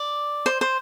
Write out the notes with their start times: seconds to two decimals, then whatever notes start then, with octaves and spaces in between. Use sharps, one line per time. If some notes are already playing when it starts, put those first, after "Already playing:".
Already playing: D5
0.46 C5
0.61 C5